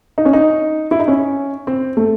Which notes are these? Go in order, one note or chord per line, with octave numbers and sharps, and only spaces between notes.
D#4
C#4
D#4
E4
D#4
C#4
C4
A3